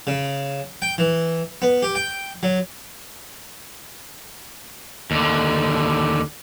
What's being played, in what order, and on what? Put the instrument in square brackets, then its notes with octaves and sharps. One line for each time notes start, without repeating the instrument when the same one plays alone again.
[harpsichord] C#3
G5
E3
B3
G4
G5
F#3
[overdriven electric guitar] D#2 D3